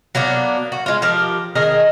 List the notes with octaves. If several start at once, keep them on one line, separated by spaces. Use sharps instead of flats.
F#3 A#3 B3 D4
F#4
G#3 F4
F3 G4 A#4
D#3 G#4 A#4 D#5